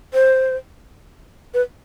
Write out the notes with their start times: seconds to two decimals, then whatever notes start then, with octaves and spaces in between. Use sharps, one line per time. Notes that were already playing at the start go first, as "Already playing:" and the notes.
0.14 C5
1.54 B4